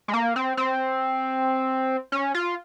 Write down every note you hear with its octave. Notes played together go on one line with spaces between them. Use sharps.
G#3
A#3
C4
C4
C#4
F4